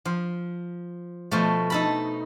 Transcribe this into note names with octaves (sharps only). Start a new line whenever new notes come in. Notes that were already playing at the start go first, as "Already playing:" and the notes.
F3
B2 F3 A3
D#4 A4 B5